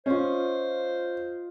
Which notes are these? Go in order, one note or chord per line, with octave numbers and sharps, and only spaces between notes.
C#4 F4 C5 D#5